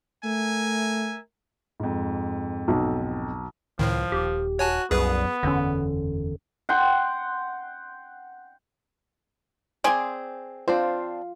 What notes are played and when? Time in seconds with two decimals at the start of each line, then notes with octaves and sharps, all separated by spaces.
0.24 A3 A#4 E5 G#5
1.80 F2 G#2
2.68 B1
3.79 C#2 A2 D#3 F3
4.12 D#1 G4
4.59 F#4 C#5 G#5 A5
4.91 C2 F#2 B3 G#4 B4
5.43 F#1 E2 D3 C#4
6.69 F#5 G5 C6
9.84 C4 G#4 D5 G#5 C6
10.68 C4 D4 F4 C5